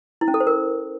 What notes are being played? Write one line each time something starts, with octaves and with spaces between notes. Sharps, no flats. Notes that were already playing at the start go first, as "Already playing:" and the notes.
E4
C#4
A4
C5
A#4